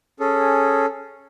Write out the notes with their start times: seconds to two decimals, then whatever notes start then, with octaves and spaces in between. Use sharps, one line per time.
0.20 C#4 G#4 A4